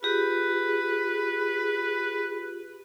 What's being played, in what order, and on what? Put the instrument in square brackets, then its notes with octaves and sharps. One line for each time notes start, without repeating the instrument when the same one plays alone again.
[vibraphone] F4 G4 [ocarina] G#4 [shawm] B4